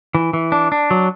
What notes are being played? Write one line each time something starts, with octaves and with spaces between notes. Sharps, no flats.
E3
E3
D4
D4
F#3